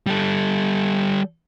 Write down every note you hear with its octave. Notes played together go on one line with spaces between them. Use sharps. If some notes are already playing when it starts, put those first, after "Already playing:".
G3 A4